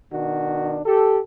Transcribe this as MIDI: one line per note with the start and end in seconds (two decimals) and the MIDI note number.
0.12 0.81 47
0.12 0.81 51
0.12 0.81 62
0.12 0.81 66
0.86 1.20 67
0.86 1.20 69